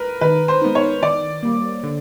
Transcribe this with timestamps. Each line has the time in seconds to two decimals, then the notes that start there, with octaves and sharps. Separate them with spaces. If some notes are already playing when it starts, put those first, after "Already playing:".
Already playing: A#4 B4
0.21 D#3 B4
0.48 C5
0.62 G#3 B3 D#4
0.75 C#5
1.03 D#3 D5
1.43 G3 A#3
1.83 D3